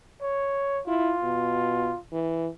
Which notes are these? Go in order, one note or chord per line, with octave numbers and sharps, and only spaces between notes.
C#5
E4 F4
B2
E3